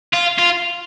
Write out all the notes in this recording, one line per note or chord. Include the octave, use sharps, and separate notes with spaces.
F4
F4